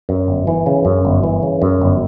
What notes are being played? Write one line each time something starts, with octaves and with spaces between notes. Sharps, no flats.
F#2
G1
E3
C#3
F#2
G1
E3
C#3
F#2
G1